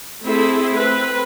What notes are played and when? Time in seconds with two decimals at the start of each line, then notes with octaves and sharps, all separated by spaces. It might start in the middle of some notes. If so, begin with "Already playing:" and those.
0.24 A3 C4 E4 G#4 A4 E5
0.74 C4 B4